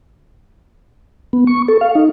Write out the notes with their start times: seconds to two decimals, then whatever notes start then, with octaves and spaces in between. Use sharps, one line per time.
1.33 B3
1.47 C#6
1.68 A4
1.81 F5
1.95 D#4